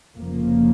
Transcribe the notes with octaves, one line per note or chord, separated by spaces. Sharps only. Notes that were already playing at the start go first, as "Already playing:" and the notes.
F1 F2 C#3 F3 A#3